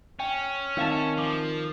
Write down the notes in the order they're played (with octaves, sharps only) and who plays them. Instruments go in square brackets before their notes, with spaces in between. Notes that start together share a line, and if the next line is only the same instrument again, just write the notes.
[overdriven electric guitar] C#4 [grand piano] G5
[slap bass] D#3 [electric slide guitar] C4 E5 A5 [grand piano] F5 F7
[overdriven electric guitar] F3 [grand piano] D6